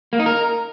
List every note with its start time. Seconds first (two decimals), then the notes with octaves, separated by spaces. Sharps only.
0.13 A#3
0.19 D#4
0.26 A#4